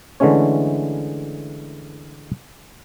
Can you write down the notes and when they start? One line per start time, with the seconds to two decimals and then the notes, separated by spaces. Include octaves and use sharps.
0.20 D3 E3 G#3 A3 C#4 C#5